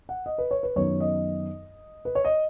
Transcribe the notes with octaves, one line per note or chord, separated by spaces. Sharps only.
F#5
D#5
B4
C#5
B4
F#2 D#3 B3 D#4 C#5
D#5
B4
C#5
D#5